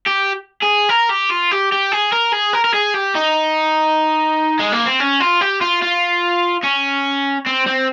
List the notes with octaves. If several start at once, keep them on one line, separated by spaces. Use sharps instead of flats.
G4
G#4
A#4
G4
F4
G4
G4
G#4
A#4
G#4
A#4
A#4
G#4
G4
D#4
G#3
A#3
C4
C#4
F4
G4
F4
F4
C#4
C4
C4